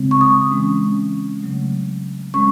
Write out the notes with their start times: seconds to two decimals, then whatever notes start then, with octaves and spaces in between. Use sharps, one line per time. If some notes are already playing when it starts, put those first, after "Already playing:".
Already playing: C#3 G#3 C4
0.11 C#6
0.21 D#6
0.51 E3 G#3 C#4
1.42 C#3 F#3 A3
2.34 G#3 C#4 C#6